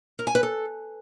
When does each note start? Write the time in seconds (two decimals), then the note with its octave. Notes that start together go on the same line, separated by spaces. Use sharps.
0.19 A#4
0.27 G#5
0.35 B4
0.43 A4